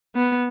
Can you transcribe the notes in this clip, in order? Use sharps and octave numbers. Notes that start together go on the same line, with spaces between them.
B3